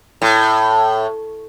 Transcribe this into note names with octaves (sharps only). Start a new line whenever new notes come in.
A2